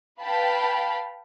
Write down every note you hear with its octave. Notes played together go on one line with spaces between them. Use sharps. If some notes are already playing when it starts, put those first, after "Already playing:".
B4 F5 G5 A5 B5